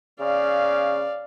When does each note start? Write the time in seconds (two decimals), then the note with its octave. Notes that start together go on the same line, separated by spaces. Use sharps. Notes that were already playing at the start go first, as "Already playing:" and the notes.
0.20 C#3 D5 F5